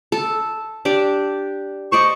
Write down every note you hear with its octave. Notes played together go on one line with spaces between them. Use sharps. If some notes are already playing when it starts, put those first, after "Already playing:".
A4
D4 G4 D5
C5 D5 D#5 C#6